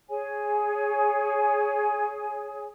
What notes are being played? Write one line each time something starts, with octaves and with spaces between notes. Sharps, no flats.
G#4 C#5 G#5